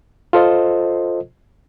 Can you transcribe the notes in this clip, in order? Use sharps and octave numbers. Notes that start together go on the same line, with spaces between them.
F4 A4 C5 D#5